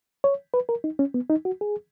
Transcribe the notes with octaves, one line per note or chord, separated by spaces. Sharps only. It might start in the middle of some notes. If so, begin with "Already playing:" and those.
C#5
B4
A#4
D#4
C#4
B3
D#4
F#4
G#4